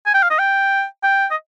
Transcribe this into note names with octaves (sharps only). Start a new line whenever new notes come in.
G#5
G5
F5
D#5
G5
G5
D#5